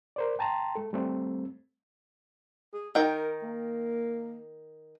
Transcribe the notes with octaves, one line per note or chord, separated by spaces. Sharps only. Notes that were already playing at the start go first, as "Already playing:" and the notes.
A#4 C5 D5
G5 A5 A#5 C6
G#3 A4
G3 A3 C4
G#4
D#3 A#4 G5
A#3